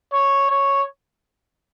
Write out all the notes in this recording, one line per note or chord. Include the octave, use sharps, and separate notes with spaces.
C#5
C#5